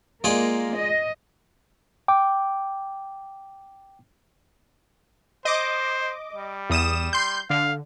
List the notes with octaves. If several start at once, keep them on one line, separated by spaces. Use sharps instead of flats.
G#3 A#3 F4 D5
D#5
G5 D6
C5 D#5 D6
G3
E2 D#6 E7
C6 G6
D3 F5